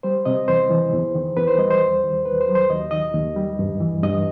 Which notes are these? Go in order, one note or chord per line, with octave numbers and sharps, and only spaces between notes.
G3 C5
C3 D#5
E2 C5
E3
E2
D#3
E2 B4
C5
G3 D#5
C5
D#2
D#3
D#2 B4
C5
F#3
C5
D#2 D#5
D#3 D#5
D#2
G3
G2
E3
G2 D#5